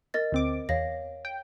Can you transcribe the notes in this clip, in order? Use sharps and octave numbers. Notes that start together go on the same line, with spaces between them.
A#4 D#5 A6
D2 C4 D6
E2 C#5 F5 A#6
G5